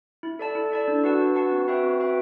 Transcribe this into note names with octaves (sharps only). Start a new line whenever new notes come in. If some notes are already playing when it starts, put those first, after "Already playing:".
E4
A4 D5 A5
E4
A4 D5 A5
D4
F#4 B4 F#5 A5
D4
F#4 B4 F#5 A5
C4
F#4 B4 E5 G5
C4
F#4 B4 E5 G5